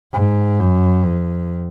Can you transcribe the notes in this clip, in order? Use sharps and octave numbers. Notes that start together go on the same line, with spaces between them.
G#2
F#2
F2